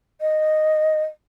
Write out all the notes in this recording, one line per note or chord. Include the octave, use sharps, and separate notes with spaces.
D#5